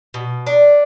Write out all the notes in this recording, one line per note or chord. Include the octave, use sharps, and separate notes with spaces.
B2
D4